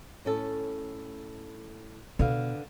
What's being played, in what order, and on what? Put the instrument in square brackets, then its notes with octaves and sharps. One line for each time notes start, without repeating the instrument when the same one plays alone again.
[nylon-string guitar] A2 C#4 A4
[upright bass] B2 [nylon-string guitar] D3 B4 F5